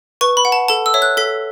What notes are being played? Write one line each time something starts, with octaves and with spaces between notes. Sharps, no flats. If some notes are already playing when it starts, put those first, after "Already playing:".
B4 C#6
B5
F#5
A5
A4 A5
E6
C#5 E5
F#6
A4 B6